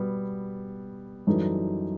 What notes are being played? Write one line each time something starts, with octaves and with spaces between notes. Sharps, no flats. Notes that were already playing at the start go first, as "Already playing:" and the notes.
Already playing: B2 G3 B3
F#2 E3 G3 D#4 A4